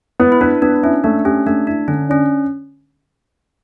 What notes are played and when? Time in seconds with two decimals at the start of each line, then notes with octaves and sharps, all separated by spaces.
0.20 B3 E4
0.32 E4
0.41 D4 B4
0.62 B3 D4
0.83 C#4 E4
1.04 A3 D4
1.25 C#4 G4
1.46 A3 D4
1.67 D4 E4
1.88 D3 C#4
2.09 C#4 D4